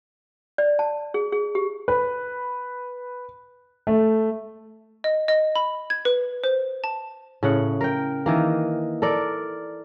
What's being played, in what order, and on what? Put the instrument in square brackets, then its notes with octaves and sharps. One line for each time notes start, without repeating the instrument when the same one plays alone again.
[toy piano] D5
A5
G#4
G#4
G4
[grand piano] B4
A3
[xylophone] D#5
D#5
B5
G#6
B4
C5
A5
[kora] A2 C#3 F#5
A#4 G5
D#3 E3 A#3
A4 A#4 D5